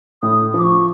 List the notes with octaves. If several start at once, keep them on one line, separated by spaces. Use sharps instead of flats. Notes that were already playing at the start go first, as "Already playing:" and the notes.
A2 D#6
F3 D6
C#6